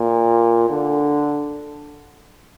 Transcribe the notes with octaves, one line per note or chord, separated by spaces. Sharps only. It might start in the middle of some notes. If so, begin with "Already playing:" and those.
Already playing: A#2
D3